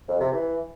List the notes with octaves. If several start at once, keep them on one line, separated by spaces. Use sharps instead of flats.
F2
C3
E3